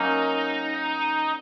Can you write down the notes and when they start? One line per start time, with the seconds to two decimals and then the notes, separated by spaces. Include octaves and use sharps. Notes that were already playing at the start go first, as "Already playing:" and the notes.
Already playing: F#3 A#3 C#4 D#4